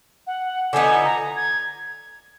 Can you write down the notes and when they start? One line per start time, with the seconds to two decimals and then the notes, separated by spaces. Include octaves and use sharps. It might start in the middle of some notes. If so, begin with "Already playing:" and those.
0.27 F#5
0.73 D3 F3 B3 D#4 G#5
1.05 A#5
1.36 G#6